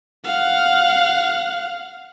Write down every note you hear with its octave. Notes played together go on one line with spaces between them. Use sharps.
F5 F#5